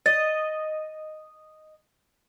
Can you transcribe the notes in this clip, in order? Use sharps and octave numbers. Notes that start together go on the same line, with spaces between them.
D#5 A6